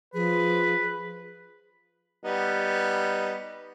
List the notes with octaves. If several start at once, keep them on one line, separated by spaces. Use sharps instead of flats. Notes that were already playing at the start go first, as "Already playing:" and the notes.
F3 G#4 B4
G3 B3 D#4